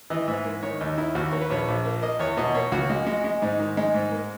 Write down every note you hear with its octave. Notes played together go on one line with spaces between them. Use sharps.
E3 D#5
G#2 E5
A#3
D#3 C#5
D#2 D#4
D#3 E4
D#2 F#4
A#3 C#5
B4
A#1 C#5
A#1
A#3
A#3 D#5
E2 C#5
B2 D#5
A#3 C#5
C#2 F#4
G#3
G#3
G#3
G#2 D#4
D#3
G#3 D#4
G#2
A#3